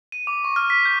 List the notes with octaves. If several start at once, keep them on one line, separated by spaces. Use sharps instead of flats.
D#7
D6
C#6
F6
B6
G6